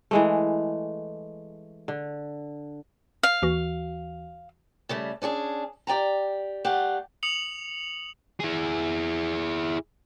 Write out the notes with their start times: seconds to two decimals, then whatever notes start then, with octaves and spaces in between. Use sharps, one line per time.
0.11 E3 G#3 A3
1.88 D3
3.23 F5
3.42 D#2 E3 F#4
4.89 C#3 G3 A3
5.22 C#4 D4 F#4 G#4
5.87 G4 D5 G5 A#5
6.64 G3 A3 G4 F5 F#5
7.23 D#6 C#7 F7 F#7
8.40 E4 G#4